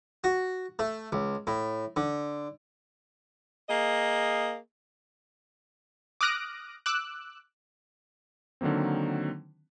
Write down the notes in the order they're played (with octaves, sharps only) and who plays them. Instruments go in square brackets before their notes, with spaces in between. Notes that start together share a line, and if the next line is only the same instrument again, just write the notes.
[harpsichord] F#4
A3
C#2
A2
D3
[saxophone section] A#3 G#4 D#5
[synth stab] D6 D#6 F6 F#6 A#6 D7
D6 E6 F#6
[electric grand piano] D3 D#3 F#3 A#3 C4